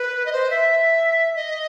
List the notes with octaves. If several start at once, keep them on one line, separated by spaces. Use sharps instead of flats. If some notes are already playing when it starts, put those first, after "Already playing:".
Already playing: B4
D#5
C5
E5
D#5